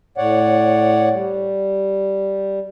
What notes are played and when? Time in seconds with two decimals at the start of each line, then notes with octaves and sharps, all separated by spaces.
0.18 A2 C#5 D5 F#5
1.13 G3